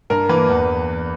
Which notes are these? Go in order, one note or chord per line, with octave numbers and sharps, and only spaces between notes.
G2 A#4
E3 A#3 B4
E2